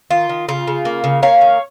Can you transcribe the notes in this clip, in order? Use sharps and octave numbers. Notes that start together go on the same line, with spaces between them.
D#3 F4
D#3
C#3 F4
C#3
A#3
C#3
A#3 C#5 F5
D#3